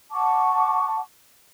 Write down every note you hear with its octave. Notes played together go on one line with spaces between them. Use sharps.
F#5 A5 C#6 D6